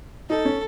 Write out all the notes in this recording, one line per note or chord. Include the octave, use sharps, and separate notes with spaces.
D#4 A4
C#4